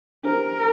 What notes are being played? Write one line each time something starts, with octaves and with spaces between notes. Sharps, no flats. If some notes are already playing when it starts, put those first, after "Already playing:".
D4 G4 A#4 C5